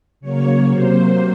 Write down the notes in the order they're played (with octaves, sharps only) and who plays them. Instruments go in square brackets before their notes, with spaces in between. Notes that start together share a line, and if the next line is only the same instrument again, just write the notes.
[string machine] C#3 F#3 A#3 C#5
C3 F#3 A#3 C5